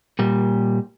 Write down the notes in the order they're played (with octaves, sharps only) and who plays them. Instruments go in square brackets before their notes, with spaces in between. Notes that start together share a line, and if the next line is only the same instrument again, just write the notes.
[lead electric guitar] A#2 G3